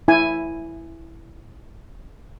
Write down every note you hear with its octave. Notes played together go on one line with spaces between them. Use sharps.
E4 G#5